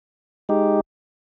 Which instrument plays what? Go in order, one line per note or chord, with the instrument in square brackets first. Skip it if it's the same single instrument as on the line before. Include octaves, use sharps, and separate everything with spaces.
[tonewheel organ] G#3 D#4 G4